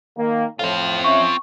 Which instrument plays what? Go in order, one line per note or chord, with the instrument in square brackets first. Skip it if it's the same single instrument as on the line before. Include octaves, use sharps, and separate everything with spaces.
[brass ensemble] D#3 A#3
[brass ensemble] F2 A2 [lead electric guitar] C4 F4
[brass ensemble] C#4 E5 [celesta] C#6